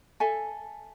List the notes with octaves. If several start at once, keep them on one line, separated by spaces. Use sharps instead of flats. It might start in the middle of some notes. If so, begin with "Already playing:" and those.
A4 E5 G#5